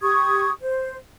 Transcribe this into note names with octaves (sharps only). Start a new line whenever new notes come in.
G4 C#6 D#6 G#6
C5